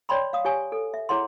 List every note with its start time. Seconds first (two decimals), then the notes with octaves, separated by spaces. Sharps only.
0.09 C#5 D5 G5 B5 C6
0.33 F5 D#6
0.45 G4 C#5 G#5
0.72 A4
0.94 E5
1.09 E4 G#4 C#5 F#5 C6